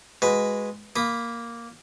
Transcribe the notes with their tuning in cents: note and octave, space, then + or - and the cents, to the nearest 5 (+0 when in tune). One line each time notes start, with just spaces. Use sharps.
G#3 +0 F#4 +0 B4 +0
A#3 +0 B5 +0 D#6 -25